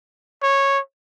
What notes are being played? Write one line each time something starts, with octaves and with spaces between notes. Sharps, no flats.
C#5